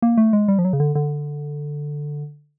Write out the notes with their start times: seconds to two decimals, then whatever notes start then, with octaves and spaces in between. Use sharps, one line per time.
0.02 A#3
0.18 A3
0.33 G#3
0.48 G3
0.59 F3
0.65 F#3
0.73 C#3
0.80 D3
0.95 D3